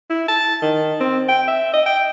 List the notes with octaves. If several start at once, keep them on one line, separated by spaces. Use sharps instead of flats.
E4
A5
D#3
C4
G5
E5
D#5
G5